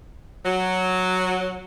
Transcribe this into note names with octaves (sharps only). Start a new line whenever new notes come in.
F#3